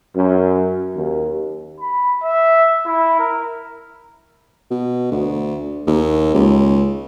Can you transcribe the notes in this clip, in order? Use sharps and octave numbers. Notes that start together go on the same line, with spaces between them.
F#2
D#2
B5
E5
E4
A#4
B2
D2
D#2
C#2